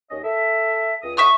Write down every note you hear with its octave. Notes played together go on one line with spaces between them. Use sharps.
D#2 C#4 D#5
A4 E5
C#2 D#6
A2 E5 F#5 C#6 D#6 F6